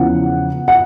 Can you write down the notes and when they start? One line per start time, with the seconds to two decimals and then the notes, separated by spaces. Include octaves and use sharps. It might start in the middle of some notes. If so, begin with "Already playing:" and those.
Already playing: E2 C#3 F3 F#5
0.68 F#5